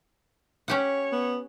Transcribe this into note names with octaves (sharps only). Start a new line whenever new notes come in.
C#4 G4 C#5 F#5
B3